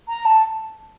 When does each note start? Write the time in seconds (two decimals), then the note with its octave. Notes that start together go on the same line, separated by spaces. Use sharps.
0.08 A#5
0.25 A5